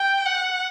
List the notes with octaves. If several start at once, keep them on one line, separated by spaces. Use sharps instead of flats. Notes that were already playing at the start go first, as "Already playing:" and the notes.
Already playing: G5
F#5